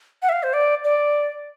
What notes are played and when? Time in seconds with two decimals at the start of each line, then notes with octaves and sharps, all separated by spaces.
0.22 F#5
0.29 E5
0.32 F5
0.43 C5
0.53 D5
0.84 D5